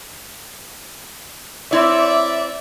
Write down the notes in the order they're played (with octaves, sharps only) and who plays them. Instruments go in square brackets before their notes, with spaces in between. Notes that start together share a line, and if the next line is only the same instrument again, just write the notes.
[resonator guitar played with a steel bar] C4 E4 C#5 [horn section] D5 E5